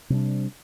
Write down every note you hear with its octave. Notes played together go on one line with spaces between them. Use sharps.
C3 G3 D4